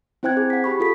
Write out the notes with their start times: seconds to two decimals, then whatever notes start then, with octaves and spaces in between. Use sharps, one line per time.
0.23 C4 E4 C5 G5 F#6 G#6
0.37 G#4
0.50 F#5 B6
0.64 G4 B5 C#6
0.80 F4 A4 B6